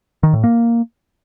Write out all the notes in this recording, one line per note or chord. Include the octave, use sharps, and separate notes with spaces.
D#3
A2
A#3